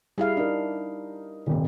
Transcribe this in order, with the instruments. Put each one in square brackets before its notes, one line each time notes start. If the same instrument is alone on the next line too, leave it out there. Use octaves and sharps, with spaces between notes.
[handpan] G3 E4 F5 [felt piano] G#4
[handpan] D4 [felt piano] D#4 A#4
[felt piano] D#1 G#1 C3